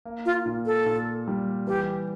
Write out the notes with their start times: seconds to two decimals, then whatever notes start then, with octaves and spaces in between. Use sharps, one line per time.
0.05 A#3
0.26 F4
0.46 A#2
0.66 A4
0.86 A#2
1.28 G3
1.67 E3 G4